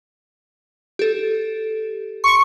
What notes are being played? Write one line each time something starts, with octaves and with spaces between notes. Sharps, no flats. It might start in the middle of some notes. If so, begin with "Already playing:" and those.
G4 A4
C6 C#6 D7